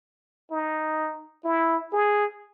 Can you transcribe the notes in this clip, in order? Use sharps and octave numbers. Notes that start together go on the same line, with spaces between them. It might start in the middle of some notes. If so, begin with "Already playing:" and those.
D#4
E4
G#4